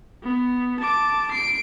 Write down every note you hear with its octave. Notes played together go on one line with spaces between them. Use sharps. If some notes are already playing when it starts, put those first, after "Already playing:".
B3
A5 D6
C7 D7